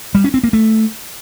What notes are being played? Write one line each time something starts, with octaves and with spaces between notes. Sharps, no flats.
G3
C#4
C4
A#3
A3